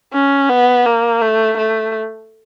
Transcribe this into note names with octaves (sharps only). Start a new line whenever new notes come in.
C#4
B3
A#3
A3
A3